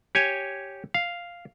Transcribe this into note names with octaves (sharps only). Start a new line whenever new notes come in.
G4 C#5 G#5
F5